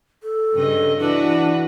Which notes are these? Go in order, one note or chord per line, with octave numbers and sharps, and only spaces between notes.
A4
G2 C#3 D#5
E3 D4 F#4 B4